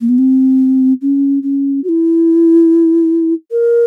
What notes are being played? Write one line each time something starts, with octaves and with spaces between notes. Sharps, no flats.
A#3
B3
C4
C#4
C#4
F#4
E4
A#4